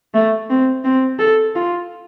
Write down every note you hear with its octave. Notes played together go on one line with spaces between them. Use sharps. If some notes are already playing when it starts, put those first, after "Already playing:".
A3
C4
C4
A4
F4